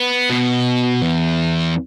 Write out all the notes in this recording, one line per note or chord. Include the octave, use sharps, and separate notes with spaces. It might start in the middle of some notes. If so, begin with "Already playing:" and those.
Already playing: B3
B2
E2